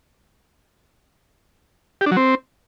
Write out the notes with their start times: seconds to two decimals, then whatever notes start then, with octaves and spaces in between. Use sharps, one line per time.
2.01 G4
2.06 D4
2.12 F#3
2.17 C4